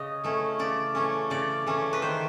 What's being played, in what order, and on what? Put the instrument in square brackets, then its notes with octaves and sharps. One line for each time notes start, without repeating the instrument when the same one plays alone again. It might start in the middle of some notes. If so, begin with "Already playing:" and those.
Already playing: [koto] C#3 C#4 D#5
E3 A3 C#4
C#3 D5
E3 A3 C#4
C#3 D5
E3 A3 C#4
B4
D#3 C5